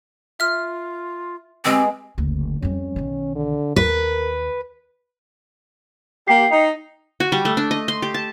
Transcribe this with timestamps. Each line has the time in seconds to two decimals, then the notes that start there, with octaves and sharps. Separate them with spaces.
0.40 F4 E5 F6
1.65 G#3 B3 C4 G4 B5
2.18 F#1 D2
2.62 F2 G3 C#4
2.96 B1 D#3
3.36 D3
3.76 D#2 A#4 B4
6.28 A#3 G4 G5 C7
6.51 D#4
7.20 F#4
7.32 G3
7.45 A3
7.57 D4
7.71 D#5
7.88 C6
8.02 G4
8.14 A5